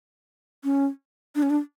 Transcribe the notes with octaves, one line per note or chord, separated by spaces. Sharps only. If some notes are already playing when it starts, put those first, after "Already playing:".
C#4
D4
C#4
D4